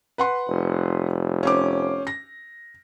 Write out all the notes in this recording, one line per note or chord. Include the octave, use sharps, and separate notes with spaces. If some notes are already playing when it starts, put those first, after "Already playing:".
B4 F#5 C6
F1
C#4 C5 D6
A#6